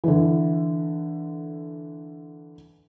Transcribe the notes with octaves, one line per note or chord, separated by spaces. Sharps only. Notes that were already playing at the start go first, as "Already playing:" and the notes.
D3 E3